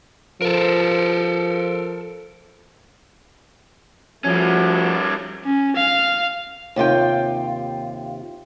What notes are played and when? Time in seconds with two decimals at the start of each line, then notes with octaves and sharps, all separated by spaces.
0.42 F3 A4 A#4
4.24 F3 G3 A3 C#4 F#4
5.45 C#4
5.76 F5
6.76 D#2 C3 F4 G5